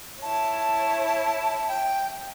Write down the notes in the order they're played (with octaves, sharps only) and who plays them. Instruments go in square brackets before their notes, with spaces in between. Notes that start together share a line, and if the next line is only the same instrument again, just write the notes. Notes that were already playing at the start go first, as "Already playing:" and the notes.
[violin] E4 C#5 [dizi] A5
[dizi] G5